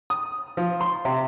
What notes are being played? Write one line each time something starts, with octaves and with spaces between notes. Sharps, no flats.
D#6
F3
C6
C3